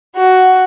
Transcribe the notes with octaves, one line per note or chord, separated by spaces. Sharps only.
F#4